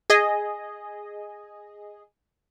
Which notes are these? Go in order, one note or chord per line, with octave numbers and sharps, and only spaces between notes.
G#4 D#5